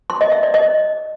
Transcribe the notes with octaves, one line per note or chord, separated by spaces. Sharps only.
C6
D#5
E5
D5
D#5